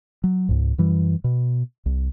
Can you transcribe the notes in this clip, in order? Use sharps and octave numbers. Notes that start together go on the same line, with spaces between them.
F#3
C#2 G#2
F#2 E3 G3
B2
C2